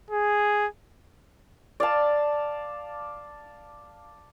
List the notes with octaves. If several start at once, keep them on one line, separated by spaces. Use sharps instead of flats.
G#4
D5 F5 A5